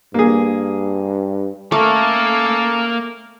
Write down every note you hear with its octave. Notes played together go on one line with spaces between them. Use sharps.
G2 A#3 G#4
A3 A#3 C#4 A4 A#4 F5